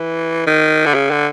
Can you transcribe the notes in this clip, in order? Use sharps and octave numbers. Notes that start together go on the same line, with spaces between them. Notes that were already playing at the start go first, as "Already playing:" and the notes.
Already playing: E3
D#3
D3
C#3
D3